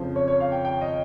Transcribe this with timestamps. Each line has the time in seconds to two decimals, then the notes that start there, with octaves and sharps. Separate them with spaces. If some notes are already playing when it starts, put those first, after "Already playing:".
Already playing: F2 C#3 F3 C5
0.16 C#5
0.28 C#5
0.40 F5
0.52 G5
0.65 G5
0.81 D#5